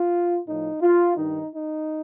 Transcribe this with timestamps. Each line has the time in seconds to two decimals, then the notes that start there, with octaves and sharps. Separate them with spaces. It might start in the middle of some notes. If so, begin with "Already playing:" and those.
Already playing: F4
0.46 A2 F3 D#4
0.81 F4
1.16 G2 D#3 D#4
1.52 D#4